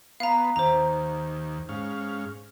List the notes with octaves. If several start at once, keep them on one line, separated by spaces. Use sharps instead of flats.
B3 F5 A#5
D#2 C5 A#5
G#2 C#4 F5